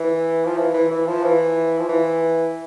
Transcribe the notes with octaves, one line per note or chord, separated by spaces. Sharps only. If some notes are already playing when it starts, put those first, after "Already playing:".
Already playing: E3
F3
E3
E3
E3
F3
E3
F3
E3